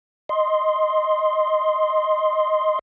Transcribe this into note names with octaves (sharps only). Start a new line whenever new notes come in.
D#5 C6